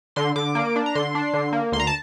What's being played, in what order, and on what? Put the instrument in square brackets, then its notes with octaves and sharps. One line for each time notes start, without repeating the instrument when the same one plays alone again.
[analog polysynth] D3 C6
D3 D6
A#3
D4
A#5
D3 C6
D4
D3
A#3
D2 C6
A#5
A5